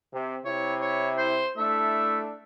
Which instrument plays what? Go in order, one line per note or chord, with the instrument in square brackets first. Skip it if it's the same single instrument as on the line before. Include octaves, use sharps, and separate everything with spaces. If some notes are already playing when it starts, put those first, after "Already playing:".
[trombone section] C3
[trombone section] C3 E4 [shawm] C#5
[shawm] C#5
C5
[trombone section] A3 D4 E4 [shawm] E5